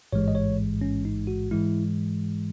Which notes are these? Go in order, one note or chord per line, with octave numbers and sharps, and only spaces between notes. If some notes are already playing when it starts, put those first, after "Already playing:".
A1 G#2 E3 G#3 C#5
D#5
C#5
C#4
D#4
F#4
G#2 E3 G#3 E4